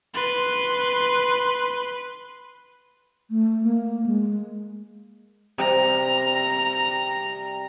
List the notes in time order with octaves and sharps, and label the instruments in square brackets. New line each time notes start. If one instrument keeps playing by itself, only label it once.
[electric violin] B4 C6
[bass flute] A3
A#3
G#3
[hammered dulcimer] C3 G3 [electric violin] A#5